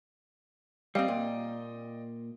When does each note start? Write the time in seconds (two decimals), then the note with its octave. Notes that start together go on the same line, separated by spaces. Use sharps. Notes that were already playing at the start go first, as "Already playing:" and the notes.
0.95 G3 C4 D5 D#5 F5 G5
1.08 A#2